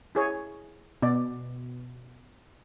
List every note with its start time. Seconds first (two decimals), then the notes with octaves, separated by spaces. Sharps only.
0.15 E4 G#4 C#5
1.02 B2 D5